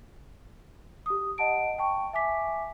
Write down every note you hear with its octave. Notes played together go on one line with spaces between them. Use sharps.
G4 D#6
D#5 F#5 A5 D7
G5 A5 C#6
E5 G#5 D6 B6